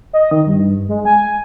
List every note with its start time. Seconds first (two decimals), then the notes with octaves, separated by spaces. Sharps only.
0.13 D#5
0.31 D#3
0.47 G2
0.89 G#3
1.05 G#5